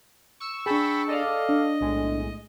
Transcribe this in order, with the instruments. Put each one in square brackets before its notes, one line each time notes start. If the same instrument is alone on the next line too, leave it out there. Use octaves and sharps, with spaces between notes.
[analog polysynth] C#6 E6
[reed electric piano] D4 G#4 [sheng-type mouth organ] G5 A5 B5
[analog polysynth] A4 D5 F5 [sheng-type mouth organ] D#5
[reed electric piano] D4
[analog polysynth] B1 A2 G#3